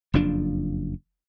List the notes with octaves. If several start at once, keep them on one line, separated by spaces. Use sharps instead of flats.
F#1 F2 F3 D4